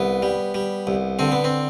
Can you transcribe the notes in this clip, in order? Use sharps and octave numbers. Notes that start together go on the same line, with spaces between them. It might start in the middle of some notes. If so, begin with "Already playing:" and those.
Already playing: C2 B3
G3
G3
C2
D3 C4
B3
C4